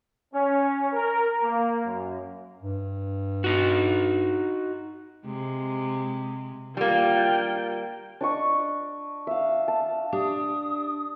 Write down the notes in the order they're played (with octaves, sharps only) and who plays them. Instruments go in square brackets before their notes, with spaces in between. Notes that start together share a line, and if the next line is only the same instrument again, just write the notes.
[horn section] C#4
A#4
A#3
F#2
[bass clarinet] G2
[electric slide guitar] D#4 F#4
[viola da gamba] C3 G#3
[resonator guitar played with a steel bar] G3 A#3 [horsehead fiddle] F4 G5
[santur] D4 D#5 C#6
E5 F5
A5
[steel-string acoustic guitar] D4 [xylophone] G4 [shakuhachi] D#6